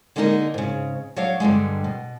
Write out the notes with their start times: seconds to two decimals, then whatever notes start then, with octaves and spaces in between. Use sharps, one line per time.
0.16 D3 G#3 A#3 D#4 A4 A#4
0.54 G#2 C#3
1.16 F#3 D4 C#5 F5
1.40 G2 D3 G3 G#3
1.84 B2